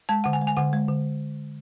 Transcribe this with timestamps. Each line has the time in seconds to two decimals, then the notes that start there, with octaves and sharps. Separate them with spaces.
0.09 G#3 A5
0.24 D3 F#5
0.33 G#5
0.41 G#3
0.47 G#5
0.57 D3 F#5
0.73 G#3
0.88 D3